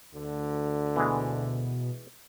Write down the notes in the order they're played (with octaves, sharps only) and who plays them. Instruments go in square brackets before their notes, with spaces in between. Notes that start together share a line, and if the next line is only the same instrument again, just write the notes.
[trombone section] D2 D3
[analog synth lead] B2 [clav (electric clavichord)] E3 G#3